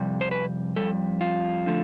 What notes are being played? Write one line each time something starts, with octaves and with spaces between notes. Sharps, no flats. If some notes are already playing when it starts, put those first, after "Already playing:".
Already playing: F2 C3 G3
C5
B4
F2 C3 G3 A4
F4
D3 F3 A3